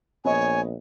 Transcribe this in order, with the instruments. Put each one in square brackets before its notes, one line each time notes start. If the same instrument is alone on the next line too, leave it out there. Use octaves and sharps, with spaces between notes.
[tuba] A#1 [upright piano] B3 D#5 [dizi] C#5 [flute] G#5